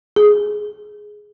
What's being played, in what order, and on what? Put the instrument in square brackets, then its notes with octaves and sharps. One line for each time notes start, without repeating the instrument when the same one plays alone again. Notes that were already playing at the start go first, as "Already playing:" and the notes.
[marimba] G#4